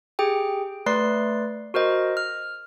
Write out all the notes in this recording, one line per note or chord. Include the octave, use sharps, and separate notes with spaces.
G4 G#4 G5
A3 B4 D5 C6 C7
F#4 A#4 C5 D#5
F6